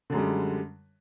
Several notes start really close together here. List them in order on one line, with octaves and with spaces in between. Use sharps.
D3 F#2 G#3 G3